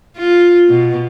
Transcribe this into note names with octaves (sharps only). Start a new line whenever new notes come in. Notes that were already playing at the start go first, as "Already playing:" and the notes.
F4
B2